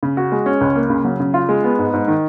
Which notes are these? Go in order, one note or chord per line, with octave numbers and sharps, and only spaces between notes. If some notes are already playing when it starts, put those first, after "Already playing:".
C#3
F#4
G#3
C#4
C#2
A#3
C#3
F#3
C#3
F4
G#3
B3
G#2
G#2
D#3